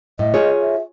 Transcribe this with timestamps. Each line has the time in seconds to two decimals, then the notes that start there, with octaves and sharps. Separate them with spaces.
0.19 A2 D#5
0.34 F4 G#4 C#5
0.60 E5